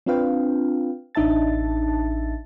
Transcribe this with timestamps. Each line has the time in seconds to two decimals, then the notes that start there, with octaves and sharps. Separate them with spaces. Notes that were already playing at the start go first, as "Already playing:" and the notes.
0.06 C4 D4 F4 B4 F5 G5
1.15 A1 D4 D#4 E5 A5 A6